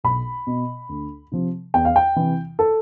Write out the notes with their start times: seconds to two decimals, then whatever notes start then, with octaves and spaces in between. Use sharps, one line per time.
0.04 B1 B5
0.47 B2
0.89 D2
1.32 C3 F3
1.74 E2 G5
1.85 F5
1.96 G5
2.16 C3 E3
2.59 A4